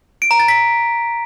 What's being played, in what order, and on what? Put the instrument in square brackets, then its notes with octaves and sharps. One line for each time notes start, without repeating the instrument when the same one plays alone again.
[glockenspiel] D7
A#5
A6
B6